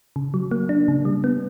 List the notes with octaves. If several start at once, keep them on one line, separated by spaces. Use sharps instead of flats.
C#3
F#3
A#3
D4
C#3
G3
B3